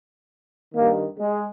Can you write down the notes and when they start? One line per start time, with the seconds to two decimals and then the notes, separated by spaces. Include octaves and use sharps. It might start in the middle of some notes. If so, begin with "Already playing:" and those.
0.74 G2 D#3 A#3
1.18 G#3